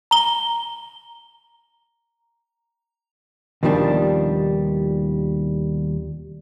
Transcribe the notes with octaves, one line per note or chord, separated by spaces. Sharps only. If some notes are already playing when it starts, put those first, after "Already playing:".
A#5 G7
D#2 B2 D#3 F3 G3 D4